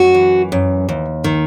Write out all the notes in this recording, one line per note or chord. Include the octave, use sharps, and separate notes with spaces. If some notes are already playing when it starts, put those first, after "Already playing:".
Already playing: F#2 F#4
E3
F#2
D#2
D#3